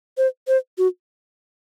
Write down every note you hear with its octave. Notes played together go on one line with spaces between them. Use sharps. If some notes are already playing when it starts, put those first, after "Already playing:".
C5
C5
F#4